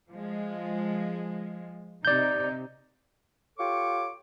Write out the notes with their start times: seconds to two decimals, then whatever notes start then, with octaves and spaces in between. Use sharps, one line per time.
0.12 F3 G#3
2.05 C3 D#4 D5 G6
3.58 F4 G4 A4 C#5 C#6 D6